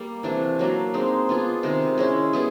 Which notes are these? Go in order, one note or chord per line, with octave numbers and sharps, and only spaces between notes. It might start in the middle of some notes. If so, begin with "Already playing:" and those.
Already playing: G3 A#3
C3 E3 A3 D4
F#3 A#3 D4
G#3 C4 D#4
B3 D4 F4 G#4
C3 D#3 G#3
G#3 C#4 E4
G3 B3 E4 G#4